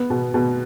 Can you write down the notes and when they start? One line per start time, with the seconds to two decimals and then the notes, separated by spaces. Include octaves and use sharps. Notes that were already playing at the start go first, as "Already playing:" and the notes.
Already playing: B3
0.10 B2
0.34 B2